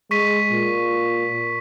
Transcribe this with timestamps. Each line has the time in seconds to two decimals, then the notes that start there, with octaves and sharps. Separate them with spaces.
0.11 G#3 C#6 B6 D#7
0.52 A#2